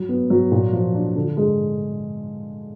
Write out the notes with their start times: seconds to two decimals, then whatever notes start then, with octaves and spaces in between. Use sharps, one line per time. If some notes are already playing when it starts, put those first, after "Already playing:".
Already playing: F#3
0.09 B3
0.30 F#3
0.52 A#2
0.73 F3
0.95 D4
1.16 D3
1.37 G#3